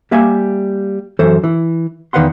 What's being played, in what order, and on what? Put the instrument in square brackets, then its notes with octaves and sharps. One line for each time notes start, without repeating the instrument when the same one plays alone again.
[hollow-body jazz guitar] G3 A#3 E5 F5 G#5
F#2 E3 A4 C5
E3
E2 D#3 B4 F5 F#5 C6